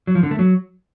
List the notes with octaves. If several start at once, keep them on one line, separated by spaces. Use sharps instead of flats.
F#3
F3
D3
A3
F#3